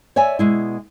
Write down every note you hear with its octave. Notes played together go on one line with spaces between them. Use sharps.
C#5 D5 E5 G#5
B2 G#3 E4